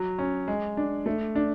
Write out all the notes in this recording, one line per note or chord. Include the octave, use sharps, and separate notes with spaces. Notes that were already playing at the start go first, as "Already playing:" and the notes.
Already playing: F#3
C#4
G#3
D4
A3
D4